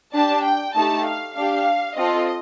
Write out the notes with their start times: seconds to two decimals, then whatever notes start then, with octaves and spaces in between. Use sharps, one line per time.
0.13 D4 G4 A5
0.44 G5
0.75 A3 D#4 G4 A5
1.06 F5
1.36 D4 G4 F5
1.97 C4 F4 A4 D#5